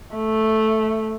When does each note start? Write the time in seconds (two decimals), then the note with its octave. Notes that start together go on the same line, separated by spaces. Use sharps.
0.15 A3